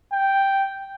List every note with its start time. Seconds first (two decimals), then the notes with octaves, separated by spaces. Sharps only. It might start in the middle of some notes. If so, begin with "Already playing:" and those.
0.13 G5